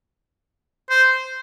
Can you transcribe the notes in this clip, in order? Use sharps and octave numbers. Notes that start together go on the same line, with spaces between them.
C5